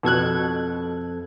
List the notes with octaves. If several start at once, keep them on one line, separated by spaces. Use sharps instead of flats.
F2 B2 A4 F#6 G#6